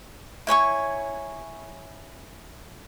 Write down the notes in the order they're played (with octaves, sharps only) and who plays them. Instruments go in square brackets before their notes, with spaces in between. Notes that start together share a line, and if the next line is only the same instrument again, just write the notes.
[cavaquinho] E4 C#5 G#5 C#6